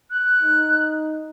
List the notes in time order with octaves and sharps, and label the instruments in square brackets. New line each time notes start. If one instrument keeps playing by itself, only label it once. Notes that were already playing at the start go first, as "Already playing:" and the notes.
[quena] F#6
[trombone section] D#4